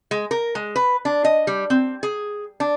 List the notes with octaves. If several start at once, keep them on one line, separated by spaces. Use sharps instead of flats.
G#3
A#4
G#3
B4
D4
D#5
G3
C4
G#4
D4